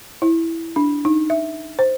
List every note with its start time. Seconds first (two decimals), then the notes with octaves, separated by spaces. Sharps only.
0.22 E4
0.76 D4
1.05 D#4
1.30 E5
1.79 C5